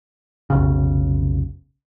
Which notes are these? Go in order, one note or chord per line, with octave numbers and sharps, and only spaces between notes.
F1 B1 C#3